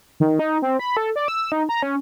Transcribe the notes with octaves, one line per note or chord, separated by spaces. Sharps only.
D#3
D#4
C4
B5
A4
D5
E6
D#4
A#5
C#4